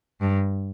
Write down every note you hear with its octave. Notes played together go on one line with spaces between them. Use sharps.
G2